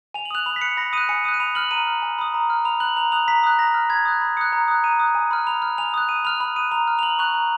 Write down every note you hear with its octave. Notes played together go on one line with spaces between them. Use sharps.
G#5 F7
F#7
D#6 F#6 F7
B5 F7
B6
F#6 C#7
B5 A#6
D#6 F#6 D#7
G#5 C#7
D#6 F#6 D#7
D#7
B5 F7
F6 F#7
A#5 D#7
F6
G#5
B5 D#6
A#5
F6
B5 F7
F#6 F#7
A#5 F7
D#6 F#6 F7
A#5 B6
D#6 F#6
A#5 A#6
F6
B5 G#6
D#6 F#6
B5
D#6 F#6 C#7
A#5
D#6 F#6
A#5 D#7
D#6 F#6
G#5
B5 F6
B5 F7
F6
G#5 F7
D#6 F#6
G#5 D#7
B5 F6 F7
B5 F7
D#6 F#6 D#7
A#5 F7
F6
F7
A#5 F#7
C#6 F#6 F7
A#5